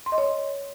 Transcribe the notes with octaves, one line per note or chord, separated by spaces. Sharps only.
C6
D#5
C#5